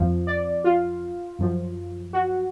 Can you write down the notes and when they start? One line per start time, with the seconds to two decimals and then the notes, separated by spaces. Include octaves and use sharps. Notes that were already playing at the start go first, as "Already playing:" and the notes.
Already playing: F2 F3
0.27 D5
0.64 F4
1.39 F#2 F3
2.13 F#4